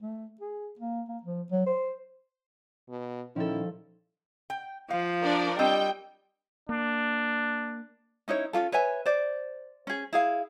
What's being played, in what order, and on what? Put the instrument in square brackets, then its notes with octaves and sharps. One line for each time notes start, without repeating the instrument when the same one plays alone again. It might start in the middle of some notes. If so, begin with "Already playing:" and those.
[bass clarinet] A3
G#4
A#3
A#3
F3
F#3
C5
[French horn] B2
[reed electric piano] A#2 C#4 [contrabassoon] D#3 [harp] F3 G3 A4 [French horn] E4
[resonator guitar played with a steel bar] G5
[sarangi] F3 [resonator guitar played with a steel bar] F5
[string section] D4 A#4 D5
[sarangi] G3 [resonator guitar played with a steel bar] C4 D#5 [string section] G5
[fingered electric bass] A#3 [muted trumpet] D4
[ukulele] C#4 D#4 E4 C#5
C#4 D4 F4 A4
B4 C#5 E5 G#5
C5 D5
C#4 G#4
E4 G#4 F5